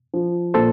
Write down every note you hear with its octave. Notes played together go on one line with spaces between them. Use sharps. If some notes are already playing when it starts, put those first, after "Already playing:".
F3
A#2 A4 C5